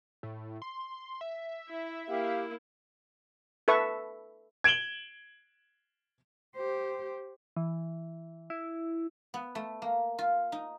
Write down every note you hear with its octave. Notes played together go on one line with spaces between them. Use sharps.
A2
C6
E5
E4
A#3 E4 G4 F5
A4 B4 E5 C#6
G#6 D7 E7 F#7 G7
G4 C5
E3
E4
B3
A3
A#3
F4
D#4